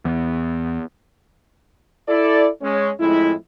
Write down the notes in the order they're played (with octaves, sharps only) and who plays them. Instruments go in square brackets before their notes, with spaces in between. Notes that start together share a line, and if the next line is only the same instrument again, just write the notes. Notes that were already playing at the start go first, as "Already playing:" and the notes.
[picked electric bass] E2
[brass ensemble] E4 A4 D5
G#3 C#4 C#5
F2 A2 G#3 E4